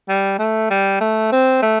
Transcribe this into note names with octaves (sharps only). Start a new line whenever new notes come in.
G3
A3
G3
A3
C4
A3